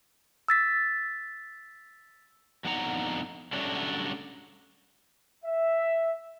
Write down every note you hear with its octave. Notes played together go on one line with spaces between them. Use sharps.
E6 A6 B6
F2 D3 B3 D#4 F#5 A#5
D3 F#3 G3 A3 C#4 D4
E5